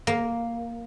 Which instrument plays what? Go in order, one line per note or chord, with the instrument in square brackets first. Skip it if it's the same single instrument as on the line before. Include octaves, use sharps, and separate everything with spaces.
[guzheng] A#3